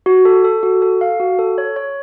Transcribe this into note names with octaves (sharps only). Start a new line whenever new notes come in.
F#4
A4
A4
F#4
A4
F5
F#4
A4
C#5
C#5